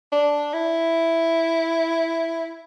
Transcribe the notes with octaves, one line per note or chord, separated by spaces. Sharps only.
D4
E4